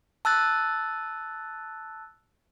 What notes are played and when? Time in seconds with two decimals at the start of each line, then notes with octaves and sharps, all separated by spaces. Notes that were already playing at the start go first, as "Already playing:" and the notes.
0.25 A5 E6 F#6 A6